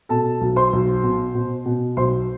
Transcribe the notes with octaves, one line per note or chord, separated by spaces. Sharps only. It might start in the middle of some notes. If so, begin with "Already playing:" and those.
B2 A4 A5
B1
C5 C6
B1
B2
B2
B2
B1 C5 C6